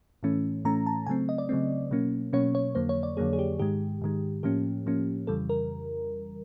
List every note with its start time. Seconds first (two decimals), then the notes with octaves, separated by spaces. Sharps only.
0.23 A2 E3 A3 C#4
0.65 A2 E3 A3 C#4 A#5
0.86 A5
1.07 C#3 F#3 A3 C4 G#5
1.29 D#5
1.38 D5
1.49 C#3 F#3 A3 C4
1.91 B2 F#3 A#3 C#4
2.33 B2 F#3 A#3 C#4 C#5
2.55 C#5
2.75 F2 D3 F#3 A#3 C5
2.89 C#5
3.03 D5
3.17 F2 D3 F#3 A#3 G#4
3.33 G#4
3.39 G4
3.59 G#2 D#3 G#3 G4
4.02 G#2 D#3 G#3
4.43 A2 F3 A#3 C#4 G4
4.86 A2 F3 A#3 C#4
5.27 F2 C#3 E3 G3 A4
5.49 A#4